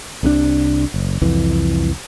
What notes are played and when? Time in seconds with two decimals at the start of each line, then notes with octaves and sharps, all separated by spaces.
0.23 C2 C3 F#3 D4
0.94 F#1
1.21 C2 F2 E3